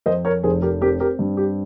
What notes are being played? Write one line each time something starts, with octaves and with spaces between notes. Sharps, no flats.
F2 C5 D#5
A#4 C#5
F1 G#4 C5
G4 A#4
C4 G4 A#4
G4 A#4
G2
G4